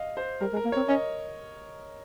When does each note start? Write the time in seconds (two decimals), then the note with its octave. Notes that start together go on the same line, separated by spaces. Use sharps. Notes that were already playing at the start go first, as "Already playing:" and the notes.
Already playing: D#5 F5
0.17 C5
0.41 G3 A#4
0.53 G#3
0.57 A#4
0.65 A#3
0.72 C4 C#5
0.88 C#4 D#5